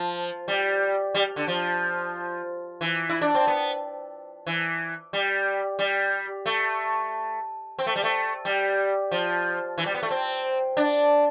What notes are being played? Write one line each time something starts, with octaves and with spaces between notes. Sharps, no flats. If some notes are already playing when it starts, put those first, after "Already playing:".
Already playing: F3
G3
G3
D3
F3
E3
E4
D4
C4
B3
E3
G3
G3
A3
C4
A3
G3
A3
G3
F3
E3
G3
B3
A3
C4
D4